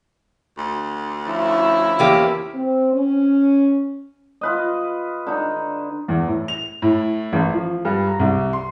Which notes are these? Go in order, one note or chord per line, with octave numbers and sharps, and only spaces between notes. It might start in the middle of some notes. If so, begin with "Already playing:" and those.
D2
F3 C#4 E4
E2 A#3 G4
C4
C#4
F4 B4 D#5
D3 D#4
E2
A2
F7
A2
A1
F3
G2
A#5
C2
C6